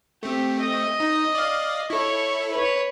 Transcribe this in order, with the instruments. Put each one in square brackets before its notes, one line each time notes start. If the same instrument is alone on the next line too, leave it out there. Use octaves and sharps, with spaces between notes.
[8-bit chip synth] A3 C4 [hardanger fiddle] G4
[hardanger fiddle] D#5
[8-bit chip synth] D#4
D5 F5
[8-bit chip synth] E4 A4 [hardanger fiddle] C#5 C#6
[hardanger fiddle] B4 C#5